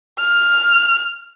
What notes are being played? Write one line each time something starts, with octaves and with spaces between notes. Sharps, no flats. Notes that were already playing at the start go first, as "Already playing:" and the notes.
F6